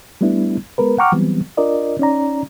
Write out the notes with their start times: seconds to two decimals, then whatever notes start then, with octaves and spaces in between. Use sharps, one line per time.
0.21 G3 A3 B3 D4 E4
0.78 G#3 B3 A#4 B4
0.98 F#5 G5 A#5 C#6 D6 F6
1.12 E3 F#3 G3 B3 C4
1.57 D4 F4 A#4 D5 D#5
1.99 C#4 D#4 D5 A#5